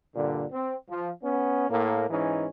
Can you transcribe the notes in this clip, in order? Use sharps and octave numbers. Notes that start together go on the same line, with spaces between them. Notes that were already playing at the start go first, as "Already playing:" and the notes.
G2 A#2 D3
C4
F3
B3 C#4
A2 A#3
G#2 E3 C#4 D#4